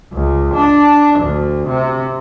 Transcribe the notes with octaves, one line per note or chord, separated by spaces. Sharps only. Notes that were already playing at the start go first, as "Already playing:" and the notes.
C#2
D4
D2
C3